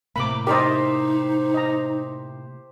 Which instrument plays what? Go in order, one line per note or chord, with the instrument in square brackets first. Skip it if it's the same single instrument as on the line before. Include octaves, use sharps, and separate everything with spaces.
[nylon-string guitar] A2 C3 A#3 [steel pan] B5 D6
[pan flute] D#4 [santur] G4 C5 [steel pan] A#4 D5 D#5
[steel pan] D#5 A#5